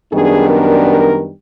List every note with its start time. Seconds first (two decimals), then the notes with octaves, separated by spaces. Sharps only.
0.12 F#2 D#3 G3 B3 D4 G#4
0.49 A#4
0.87 A#4